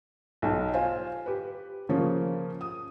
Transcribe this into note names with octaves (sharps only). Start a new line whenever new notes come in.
B1 D#4 A5
F4 C5 G#5
G4 B4
C#3 F3 A#3 C#4
D#6